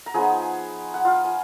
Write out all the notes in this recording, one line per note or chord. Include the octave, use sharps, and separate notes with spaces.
A#5
F3 B3 D#4 G#4 G#5
F#5
F4 F5
G#5